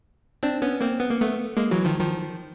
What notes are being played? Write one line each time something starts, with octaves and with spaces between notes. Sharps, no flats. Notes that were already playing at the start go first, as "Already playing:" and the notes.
C4 D4
B3 C#4
A#3 C4
B3
A#3
A3 B3
G#3 A#3
E3 F#3
D#3 F3
D#3 F3